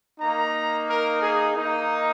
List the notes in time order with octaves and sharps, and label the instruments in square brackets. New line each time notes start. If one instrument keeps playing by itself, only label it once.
[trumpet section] A#3 D#4 A#5
A#4
G#4
A#3 D#4